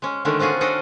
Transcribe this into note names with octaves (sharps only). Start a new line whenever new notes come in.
G#3 C#4
D3 D#3 G#3 A3 C#4 D4
C4 C#4 F4 F#4 G#4
C#4 D4 A4 C5 D5 D#5